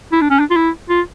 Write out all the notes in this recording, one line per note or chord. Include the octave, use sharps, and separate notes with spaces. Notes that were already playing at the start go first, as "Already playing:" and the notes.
E4
D4
C#4
D4
F4
E4
F4